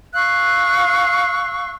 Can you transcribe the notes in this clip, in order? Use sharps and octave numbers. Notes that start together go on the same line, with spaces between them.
F5 C#6 E6 F#6